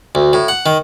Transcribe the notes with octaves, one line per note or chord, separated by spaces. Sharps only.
D2
A2
F#5
D#3